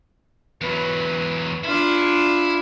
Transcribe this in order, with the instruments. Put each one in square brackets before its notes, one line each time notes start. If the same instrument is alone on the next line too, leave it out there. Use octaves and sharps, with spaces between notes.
[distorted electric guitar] E2 F#3 [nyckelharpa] B4
[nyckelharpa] D4 F4 [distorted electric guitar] E4